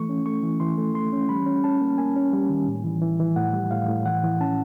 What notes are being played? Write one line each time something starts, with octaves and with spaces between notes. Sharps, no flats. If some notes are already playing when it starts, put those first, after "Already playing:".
Already playing: E3 A3 C#6
C#4
A3 C#6
E3
E3 C6
A3
A3 C6
C#4
G3 B5
C#4
C#4 A5
A#3
A#3 G#5
C#4
G3
D#3
A2
E3
E3
E3
A2 F#5
G3
A2 F5
A2
E3 F#5
E3
C#4 A5